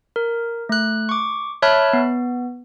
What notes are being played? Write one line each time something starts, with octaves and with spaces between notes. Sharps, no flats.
A#4
A3 F#6
C#6 D6
C#5 E5 A5 B5 F6 F#6
B3